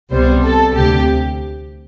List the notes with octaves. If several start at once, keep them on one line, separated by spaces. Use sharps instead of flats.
C2 C3 G3 B3 C5
A4
D2 C3 G4